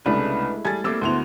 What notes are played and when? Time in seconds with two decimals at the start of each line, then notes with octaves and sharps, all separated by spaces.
0.06 C2 C#3 G#3 A3 D4 E4 B4
0.65 G3 G#4 A4 G#6 A6
0.84 G3 A3 A#3 C4 D6 E6
1.01 D2 A3 B3 E4 F#4 C5 F7